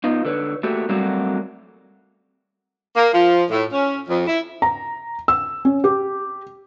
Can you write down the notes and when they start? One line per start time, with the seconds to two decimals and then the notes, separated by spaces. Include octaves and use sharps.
0.04 B3 D#4 F4
0.25 D3 B4 C#5
0.63 A3 A#3 F#4 G4
0.89 F#3 G3 A3 A#3 C4 F#4
2.96 A#3
3.13 F3
3.50 A2
3.72 C#4
4.09 F2
4.28 E4
4.62 A#5
5.28 E6
5.65 C#4
5.84 G4